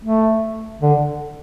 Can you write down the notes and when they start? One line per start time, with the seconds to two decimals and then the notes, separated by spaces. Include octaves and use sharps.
0.05 A3
0.82 D3